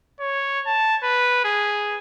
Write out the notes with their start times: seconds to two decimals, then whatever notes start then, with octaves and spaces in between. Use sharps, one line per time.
0.20 C#5
0.67 A5
1.03 B4
1.45 G#4